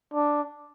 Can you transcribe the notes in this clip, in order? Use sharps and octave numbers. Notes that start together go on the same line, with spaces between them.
D4